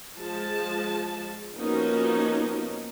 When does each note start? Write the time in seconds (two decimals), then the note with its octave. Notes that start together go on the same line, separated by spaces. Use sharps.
0.17 F3 G#3 A5
1.57 F3 A#3 B3 C#4 D#4 F#4